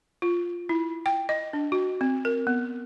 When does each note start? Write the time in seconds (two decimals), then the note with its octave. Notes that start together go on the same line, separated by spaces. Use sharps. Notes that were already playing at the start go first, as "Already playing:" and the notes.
0.22 F4
0.69 E4
1.06 G5
1.29 D#5
1.53 D4
1.72 F#4
2.01 C4
2.25 A#4
2.47 B3